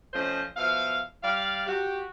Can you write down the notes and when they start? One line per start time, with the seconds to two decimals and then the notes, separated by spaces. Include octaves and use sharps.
0.14 F3 A3 C#4 C5 D#5
0.57 B2 F3 E5 F5
1.22 G3 D5 F5
1.67 F#4 G4